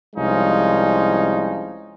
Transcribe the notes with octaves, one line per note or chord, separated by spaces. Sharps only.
C2 F3 G#3 C#4 D#4